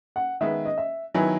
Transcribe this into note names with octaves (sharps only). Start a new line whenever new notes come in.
F#5
D#3 G#3 B3 E5
D#5
E5
D#3 F#3 B3 E4 G#5